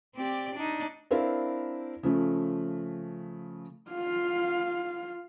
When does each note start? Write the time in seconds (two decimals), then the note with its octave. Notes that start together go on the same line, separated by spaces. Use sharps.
0.15 C4 G4 D5
0.55 D4 D#4
1.11 C4 D4 E4 A#4 C5 F5
2.03 C#3 F3 A3
3.91 F4 F5